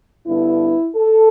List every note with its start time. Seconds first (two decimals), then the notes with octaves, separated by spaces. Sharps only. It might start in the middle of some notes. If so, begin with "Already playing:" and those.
0.26 G2 D3 B3 E4
0.95 A4